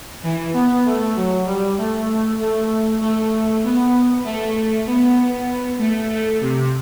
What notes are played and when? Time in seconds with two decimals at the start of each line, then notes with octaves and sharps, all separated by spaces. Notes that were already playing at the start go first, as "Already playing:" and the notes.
0.23 E3
0.54 B3
0.86 A3
1.16 F#3
1.46 G3
1.78 A3
2.39 A3
3.01 A3
3.64 B3
4.25 A3
4.87 B3
5.79 A3
6.10 A3
6.41 C3